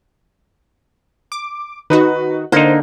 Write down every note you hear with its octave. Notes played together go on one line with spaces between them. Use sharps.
D6
D#3 D#4 F#4 B4
D3 A#3 D#4 C5